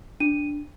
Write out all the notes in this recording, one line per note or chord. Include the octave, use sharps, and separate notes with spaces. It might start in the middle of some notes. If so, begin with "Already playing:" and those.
D4 D#7